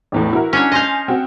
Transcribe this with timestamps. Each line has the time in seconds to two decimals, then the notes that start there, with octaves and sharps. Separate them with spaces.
0.12 A1 E2 A2
0.33 E4 F#4 A#4
0.53 C#4 D4 C#5
0.72 D#5 F5 G#5 C6 G6
1.08 C4 F#4